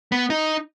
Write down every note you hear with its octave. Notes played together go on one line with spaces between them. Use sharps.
B3
D#4